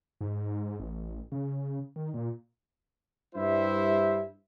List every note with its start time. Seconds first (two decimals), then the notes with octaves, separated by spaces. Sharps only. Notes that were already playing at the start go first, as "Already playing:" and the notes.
0.21 G#2
0.79 A1
1.32 C#3
1.96 D#3
2.14 A#2
3.34 G2 G3 E4 C5 E5